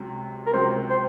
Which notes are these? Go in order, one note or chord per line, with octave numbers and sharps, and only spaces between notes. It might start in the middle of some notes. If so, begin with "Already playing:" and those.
Already playing: C#2 C3 F#3
A#4
C#2 C3 F#3 C5
C5